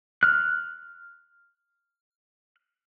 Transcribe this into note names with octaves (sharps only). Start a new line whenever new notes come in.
F6 F#6